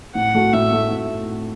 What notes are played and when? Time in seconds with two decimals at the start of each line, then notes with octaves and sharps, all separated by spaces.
0.15 A2 F#5
0.35 A3 F#4
0.53 A2 E5
0.72 A3 F#4
0.91 A2